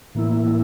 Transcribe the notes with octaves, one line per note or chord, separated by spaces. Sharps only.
A2 E3 A#3 E4